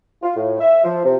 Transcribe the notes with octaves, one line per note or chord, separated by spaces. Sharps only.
F4
A2
E5
F3
C3